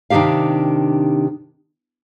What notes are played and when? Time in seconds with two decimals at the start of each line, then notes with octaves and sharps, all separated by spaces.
0.10 C3 D#3 E3 D4 G4 F5